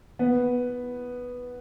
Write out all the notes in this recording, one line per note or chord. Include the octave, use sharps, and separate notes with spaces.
B3